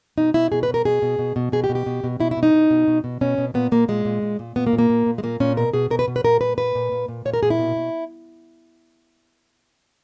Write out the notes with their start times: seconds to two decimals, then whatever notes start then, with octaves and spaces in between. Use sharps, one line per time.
0.18 B2 D#4
0.34 B2 E4
0.52 B2 G#4
0.63 B4
0.68 B2
0.74 A#4
0.85 B2 G#4
1.02 B2
1.19 B2
1.36 B2
1.52 B2 G#4
1.64 G4
1.69 B2
1.75 G4
1.86 B2
2.04 B2
2.20 B2 E4
2.31 E4
2.37 B2
2.43 D#4
2.54 B2
2.70 B2
2.87 B2
3.04 B2
3.21 B2 C#4
3.38 B2
3.54 A#2 B3
3.72 A#2 A#3
3.88 A#2 G#3
4.05 A#2
4.22 A#2
4.39 A#2
4.56 A#2 B3
4.67 A#3
4.73 A#2
4.79 A#3
4.90 A#2
5.06 A#2
5.18 G#3
5.23 A#2 A#3
5.40 A#2 C#4
5.57 B2 A#4
5.73 B2 G#4
5.90 B2 A#4
5.99 B4
6.08 B2
6.16 B4
6.24 A#2 A#4
6.41 A#2 B4
6.58 A#2 B4
6.75 A#2
6.92 A#2
7.08 A#2
7.25 A#2 C#5
7.34 A#4
7.43 A#2 G#4
7.50 E4
7.59 B2
7.76 B2